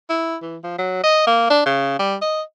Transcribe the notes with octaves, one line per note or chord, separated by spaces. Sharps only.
E4
E3
F3
F#3
D#5
A#3
D4
C#3
G3
D#5